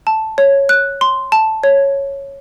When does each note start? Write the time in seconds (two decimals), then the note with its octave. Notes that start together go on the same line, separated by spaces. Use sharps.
0.07 A5
0.38 C#5
0.69 F#6
1.01 C6
1.32 A5
1.64 C#5